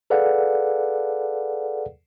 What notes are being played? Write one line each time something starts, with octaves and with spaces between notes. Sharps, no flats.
G#4 A4 B4 D5 F5 F#5